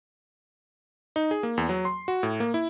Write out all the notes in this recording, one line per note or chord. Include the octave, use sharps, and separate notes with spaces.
D#4
G#4
A#3
E2
F#3
C6
F#4
A2
A#3
E4